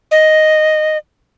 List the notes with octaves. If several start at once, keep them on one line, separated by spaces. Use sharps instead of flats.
D#5